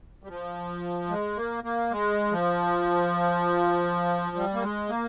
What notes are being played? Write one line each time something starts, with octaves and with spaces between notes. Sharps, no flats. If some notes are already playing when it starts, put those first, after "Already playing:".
G3
F3
G#3
A#3
A#3
G#3
F3
G3
A#3
G#3
A#3